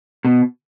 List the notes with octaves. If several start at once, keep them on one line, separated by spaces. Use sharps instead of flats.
B2